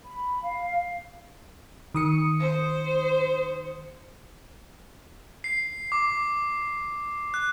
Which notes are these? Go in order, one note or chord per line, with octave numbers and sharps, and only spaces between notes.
B5
F5
D#3 D#6 C#7
C5
C7
D6
F#6